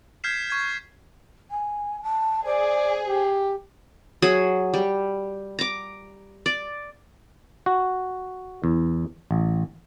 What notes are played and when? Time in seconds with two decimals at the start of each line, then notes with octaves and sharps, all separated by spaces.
0.24 F6 G6 G#6 B6 C7 E7
0.50 C#6 G#6
1.51 G#5
2.03 A5
2.45 G#4 C5 D5
3.05 G4
4.22 F#3 G#4
4.74 G3
5.59 A#5 D6
6.46 D5
7.66 F#4
8.64 E2
9.31 A1